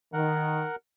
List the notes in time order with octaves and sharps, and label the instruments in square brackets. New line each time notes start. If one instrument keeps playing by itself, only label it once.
[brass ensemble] D#3 [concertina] A#4 F#5